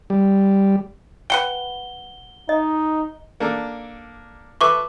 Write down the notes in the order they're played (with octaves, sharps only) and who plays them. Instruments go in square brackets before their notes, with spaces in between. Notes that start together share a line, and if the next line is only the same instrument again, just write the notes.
[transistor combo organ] G3
[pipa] B4 F#5 G5 [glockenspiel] G7
[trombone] D#4 [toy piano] D#5
[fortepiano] A#3 D4 A4
[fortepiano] A4 B4 E5 [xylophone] C#6 D6